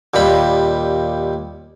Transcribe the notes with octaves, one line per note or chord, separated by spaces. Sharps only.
D#2 A#2 G3 B5